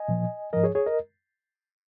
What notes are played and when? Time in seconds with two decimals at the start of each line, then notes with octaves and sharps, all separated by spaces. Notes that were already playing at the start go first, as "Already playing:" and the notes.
Already playing: D#5 G#5
0.08 A#2 F3
0.53 G#2 F3 A#4 D#5
0.64 G#4 C#5
0.75 G#4 C#5
0.86 A#4 D#5